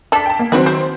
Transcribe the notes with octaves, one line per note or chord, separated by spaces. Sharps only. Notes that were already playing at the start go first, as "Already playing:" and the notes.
D4 A4 A5 B6
G5 A5
A#3
D#3 F#3 C4 D4 F#4 B4
E4 C5